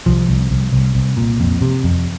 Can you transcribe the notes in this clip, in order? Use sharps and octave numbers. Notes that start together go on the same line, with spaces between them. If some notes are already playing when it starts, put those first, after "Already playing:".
C2 F3
C2
C2
C2
C2
A#2
F2
C3
F2